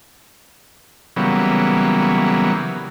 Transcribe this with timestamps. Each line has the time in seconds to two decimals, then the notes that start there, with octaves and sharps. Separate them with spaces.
1.16 C#3 E3 F#3 G3 A#3 B3